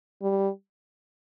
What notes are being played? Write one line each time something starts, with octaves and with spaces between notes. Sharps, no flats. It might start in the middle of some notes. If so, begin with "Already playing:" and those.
G3